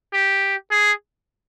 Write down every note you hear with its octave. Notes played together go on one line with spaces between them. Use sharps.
G4
G#4